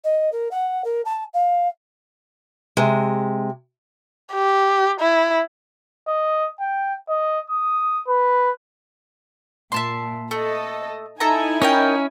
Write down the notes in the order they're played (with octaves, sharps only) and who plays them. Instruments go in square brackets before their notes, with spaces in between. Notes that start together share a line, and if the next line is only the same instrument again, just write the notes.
[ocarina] D#5
A#4
F#5
A#4
A5
F5
[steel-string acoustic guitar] C3 G#3
[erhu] G4
E4
[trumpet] D#5
G5
D#5
D#6
B4
[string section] A#2 [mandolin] E5 A5 C6
[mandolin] A3 [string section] A4 D#5
[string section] D#4 E4 G#5 [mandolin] A4 E5 A#5
[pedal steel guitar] C#4 [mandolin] A#4 D#5 G5